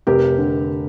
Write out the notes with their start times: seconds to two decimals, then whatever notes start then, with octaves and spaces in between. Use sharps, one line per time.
0.07 F1 G4 A#4
0.38 D3